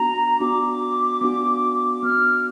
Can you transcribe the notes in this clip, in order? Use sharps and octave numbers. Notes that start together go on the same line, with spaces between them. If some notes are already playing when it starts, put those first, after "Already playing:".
Already playing: B3 D4 F#4 A#5
B3 D4 F#4 D6
B3 D4 F#4
B3 D4 F#4 F6